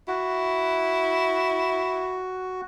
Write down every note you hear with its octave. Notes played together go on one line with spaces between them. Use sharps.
E4 F#4